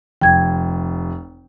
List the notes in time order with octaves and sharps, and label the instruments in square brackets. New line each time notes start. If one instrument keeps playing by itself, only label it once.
[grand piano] F1 [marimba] G5 G#6